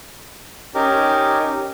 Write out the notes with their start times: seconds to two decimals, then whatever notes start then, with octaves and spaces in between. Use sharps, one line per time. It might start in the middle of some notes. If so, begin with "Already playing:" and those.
0.75 C#4 D#4 G4 A#4